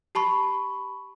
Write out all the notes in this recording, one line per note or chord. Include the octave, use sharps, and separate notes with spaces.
G4 A5 B5 C#6